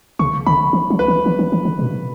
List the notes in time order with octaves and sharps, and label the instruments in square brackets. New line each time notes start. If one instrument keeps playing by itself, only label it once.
[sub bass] C#3 [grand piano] C#6
[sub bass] D3 [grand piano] B5
[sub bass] E3
F#3
[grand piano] B4
[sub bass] E3
E3
E3
E3
D3
B2